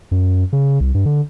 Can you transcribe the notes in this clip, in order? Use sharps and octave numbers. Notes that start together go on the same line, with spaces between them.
F#2
C#3
C2
G2
D3